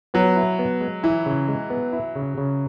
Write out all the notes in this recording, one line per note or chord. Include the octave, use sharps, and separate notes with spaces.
F#3 B3
E4
B3
G#3
E3 E4
C#3
G#3
B3
E4
C#3
C#3